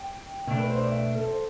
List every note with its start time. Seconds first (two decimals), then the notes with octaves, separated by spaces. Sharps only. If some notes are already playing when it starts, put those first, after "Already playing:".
Already playing: G5
0.47 B2 A3 D4
0.59 B4
0.70 C5
0.80 D5
0.92 E5
1.15 A4
1.27 C5